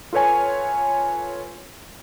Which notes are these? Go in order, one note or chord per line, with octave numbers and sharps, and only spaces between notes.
F4 A4 B4 C#5 G#5